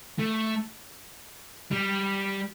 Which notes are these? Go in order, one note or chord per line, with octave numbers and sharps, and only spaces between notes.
A3
G3